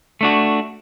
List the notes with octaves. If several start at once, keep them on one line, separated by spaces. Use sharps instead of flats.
A3 D4 F#4